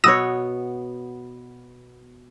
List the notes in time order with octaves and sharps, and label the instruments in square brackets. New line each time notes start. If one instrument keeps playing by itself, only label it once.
[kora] B2 B3 C#5 [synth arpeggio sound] D#6 E6 A#6